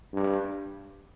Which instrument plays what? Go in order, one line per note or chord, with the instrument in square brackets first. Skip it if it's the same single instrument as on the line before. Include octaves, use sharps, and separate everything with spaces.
[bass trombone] G2